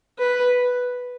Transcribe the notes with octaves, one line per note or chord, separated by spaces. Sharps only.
B4